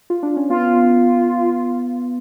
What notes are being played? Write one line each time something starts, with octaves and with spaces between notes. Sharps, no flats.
F4
D4
C#4
B3 F4